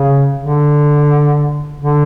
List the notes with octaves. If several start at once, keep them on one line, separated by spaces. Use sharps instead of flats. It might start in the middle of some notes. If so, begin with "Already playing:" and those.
Already playing: C#3
D3
D3